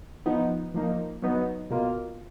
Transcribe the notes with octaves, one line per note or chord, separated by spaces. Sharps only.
F3 B3 D#4
F3 A#3 D#4
F#3 B3 D#4
B2 A#3 F4